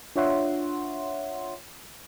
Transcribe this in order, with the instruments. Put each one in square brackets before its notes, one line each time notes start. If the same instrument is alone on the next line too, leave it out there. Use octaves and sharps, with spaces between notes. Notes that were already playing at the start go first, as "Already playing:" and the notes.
[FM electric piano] D4 F4 C#5 E5 F#5 C6